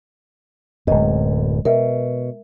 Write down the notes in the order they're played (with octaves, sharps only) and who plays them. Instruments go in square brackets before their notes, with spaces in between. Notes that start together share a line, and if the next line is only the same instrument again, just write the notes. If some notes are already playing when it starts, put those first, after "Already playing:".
[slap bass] D1 F#2 [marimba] G#3 D#5
[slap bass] B2 [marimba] A#4 E5